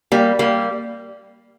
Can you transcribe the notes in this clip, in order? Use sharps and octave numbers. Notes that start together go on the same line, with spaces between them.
G3 A#3
G3 A#3